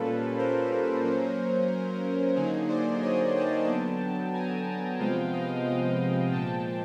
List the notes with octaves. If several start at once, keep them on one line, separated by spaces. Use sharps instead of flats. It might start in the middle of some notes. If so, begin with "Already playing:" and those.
Already playing: A#2 G3 A#3 C#4 F4 A4 B4
A#4 C5
F#3 A#3 C#4
D3 F#3 A#3 D#4 G#4
C5 D5
C#5 D#5
G5 A5
D3 F#3 B3
G#5 A#5
C3 F3 G#3 B3 F5 G5
D#5 F5
D#5 F5
A#2 F3 G#3 G5 A5